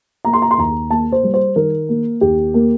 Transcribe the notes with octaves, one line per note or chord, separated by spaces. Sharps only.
A#3 A#5
C6
A#5
C6
D#2 A#5
A#3 A5
C5
G3
C5
D#3 A#4
A#3
D#2 G4
A#3